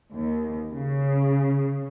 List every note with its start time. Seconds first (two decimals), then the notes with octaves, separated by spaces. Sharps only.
0.14 D#2
0.72 C#3